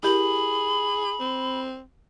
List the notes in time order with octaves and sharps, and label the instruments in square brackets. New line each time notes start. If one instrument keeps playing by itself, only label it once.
[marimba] E4 G4 A#4 [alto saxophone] G#4 [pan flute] B5
[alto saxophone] C4